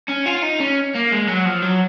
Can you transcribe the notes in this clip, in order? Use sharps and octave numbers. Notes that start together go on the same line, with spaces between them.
C#4
F4
D#4
C#4
A#3
G#3
F#3
F3
F#3